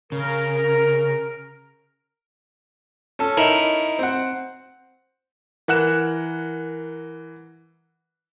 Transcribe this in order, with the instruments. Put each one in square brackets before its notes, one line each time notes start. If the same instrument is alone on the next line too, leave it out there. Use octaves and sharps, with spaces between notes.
[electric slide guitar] C#3 [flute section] A#4
[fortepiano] C#4 A4
[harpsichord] D#4 E4 A#4
[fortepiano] C4 F#5
[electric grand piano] E3 A#4 F#5 F#6 E7